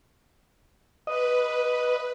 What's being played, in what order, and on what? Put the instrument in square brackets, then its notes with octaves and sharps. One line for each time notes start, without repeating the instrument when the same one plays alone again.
[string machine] B4 [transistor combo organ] D#5